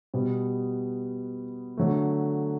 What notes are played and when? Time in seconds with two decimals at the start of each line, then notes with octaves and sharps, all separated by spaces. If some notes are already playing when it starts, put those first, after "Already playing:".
0.14 B2 G3 B3
1.77 D3 F#3 A3